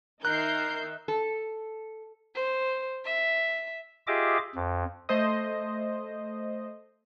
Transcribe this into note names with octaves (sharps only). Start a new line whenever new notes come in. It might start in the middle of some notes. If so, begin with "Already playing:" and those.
D#3 D#4 A#4 E5 F#6 G6 C7
A4
C5
E5
F4 G4 G#4 D#5 E5 D6
F2
A3 C5 D#5